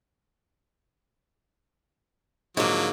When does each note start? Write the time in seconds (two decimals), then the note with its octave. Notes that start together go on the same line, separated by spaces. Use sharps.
2.57 G#2 D3 F3 F#3 A#3